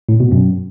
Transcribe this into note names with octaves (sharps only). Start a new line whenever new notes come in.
A2
B2
F#2